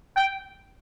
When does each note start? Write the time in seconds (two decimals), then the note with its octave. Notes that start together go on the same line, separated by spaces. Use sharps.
0.17 G5